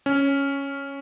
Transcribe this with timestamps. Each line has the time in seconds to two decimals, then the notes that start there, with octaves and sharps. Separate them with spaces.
0.06 C#4